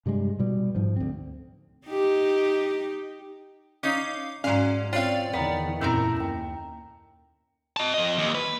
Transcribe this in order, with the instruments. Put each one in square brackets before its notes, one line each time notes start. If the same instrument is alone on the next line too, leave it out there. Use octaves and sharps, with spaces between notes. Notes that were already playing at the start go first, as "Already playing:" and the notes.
[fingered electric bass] G2 C3 G3 G#3
B2 G3
G#2 F3
D2 C4
[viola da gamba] D#4 G4
[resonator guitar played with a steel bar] C#4 D#4 [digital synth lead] F5 [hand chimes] D6
[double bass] G#2 [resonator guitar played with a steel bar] F#3 F5 [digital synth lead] C#4 [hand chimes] D5 G#5 C6
[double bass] C4 [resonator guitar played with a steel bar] F4 F5 [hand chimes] C#5 G5 [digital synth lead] D5
[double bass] E2 D#3 [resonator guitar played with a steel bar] B3 [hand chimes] F5 G5 A#5
[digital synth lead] F#2 [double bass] A#2 E4 [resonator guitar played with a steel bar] A3 C4 A#4 [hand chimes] E6
[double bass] D#2 [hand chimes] G5 A#5
[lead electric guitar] D#5 A5
F2 D#5
D#2
B4